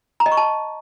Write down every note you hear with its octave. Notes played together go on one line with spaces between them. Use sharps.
A#5
D#5
C#6
A5